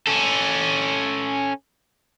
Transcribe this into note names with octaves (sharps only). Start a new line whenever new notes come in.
C#4 A4